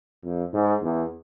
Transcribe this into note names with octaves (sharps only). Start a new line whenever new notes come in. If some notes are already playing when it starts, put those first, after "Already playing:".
F2
G#2
E2